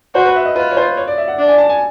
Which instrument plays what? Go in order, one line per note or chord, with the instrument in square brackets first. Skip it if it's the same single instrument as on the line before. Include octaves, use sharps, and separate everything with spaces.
[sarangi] F#4 [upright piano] C5
[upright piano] B4
E5
D#5
[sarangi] F4 [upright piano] B4
[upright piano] C#5
C5
C#5
D5
E5
F#5
[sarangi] D4
[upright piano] G#5
A5
G#5